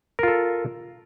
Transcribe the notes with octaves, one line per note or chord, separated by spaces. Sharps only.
F4 A4 A#4